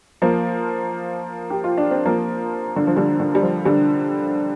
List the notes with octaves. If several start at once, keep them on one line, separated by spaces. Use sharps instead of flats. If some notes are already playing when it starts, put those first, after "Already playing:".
F3 A#3
G4
F4
D4
C4
F3 A#3
D3
F3
D3 G3
D3
G3
F3
D3 G3